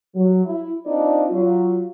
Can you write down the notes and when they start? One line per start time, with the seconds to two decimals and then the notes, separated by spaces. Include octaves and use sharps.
0.15 F#3
0.45 E4
0.86 C4 D4 D#4 F4 D5
1.30 F#3 F4